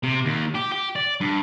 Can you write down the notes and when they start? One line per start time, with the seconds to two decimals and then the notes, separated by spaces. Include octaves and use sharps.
0.03 C3
0.25 D#2
0.55 G4
0.72 G4
0.96 D5
1.21 G2